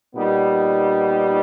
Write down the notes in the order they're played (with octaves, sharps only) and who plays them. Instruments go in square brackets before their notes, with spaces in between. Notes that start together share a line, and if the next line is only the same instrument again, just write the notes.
[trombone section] A#2 G3 B3 D#4